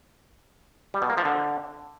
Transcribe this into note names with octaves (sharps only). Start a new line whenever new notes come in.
G3
B2
A#3
F3
D3